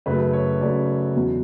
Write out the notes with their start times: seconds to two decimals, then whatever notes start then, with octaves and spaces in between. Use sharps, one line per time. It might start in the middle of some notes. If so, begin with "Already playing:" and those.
0.06 F#2 C#3 F#3 A3 B4
0.33 C#5
0.61 F#2 C#3 F#3 A3 D5
1.15 E2 B2 F#3